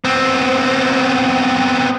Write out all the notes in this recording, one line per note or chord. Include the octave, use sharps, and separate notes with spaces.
B3 C4